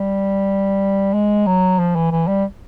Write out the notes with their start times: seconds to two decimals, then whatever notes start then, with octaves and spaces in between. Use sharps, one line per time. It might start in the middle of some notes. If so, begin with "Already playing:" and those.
Already playing: G3
1.14 G#3
1.47 F#3
1.79 F3
1.96 E3
2.11 E3
2.28 G3